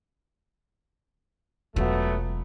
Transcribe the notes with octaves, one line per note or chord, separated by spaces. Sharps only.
E1 F#3 A3 B3 F4